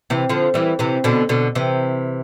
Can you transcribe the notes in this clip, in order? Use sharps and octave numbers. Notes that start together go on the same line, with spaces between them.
C3 E3
D3 F3
E3 G3
C3 E3
B2 D3
B2 D3
C3 E3